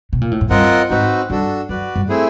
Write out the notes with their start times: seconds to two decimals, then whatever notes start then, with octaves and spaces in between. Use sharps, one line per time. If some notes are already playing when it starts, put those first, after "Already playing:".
0.13 B2
0.21 A#2
0.31 A2
0.41 G#2
0.50 G2 C4 F4 A#4 D#5 F#5
0.90 G#2 C4 D#4 F#4 B4
1.30 G2 D4 F#4 A4
1.69 F#2 F#4 B4 D5
1.96 G2
2.08 A3 C4 E4 G#4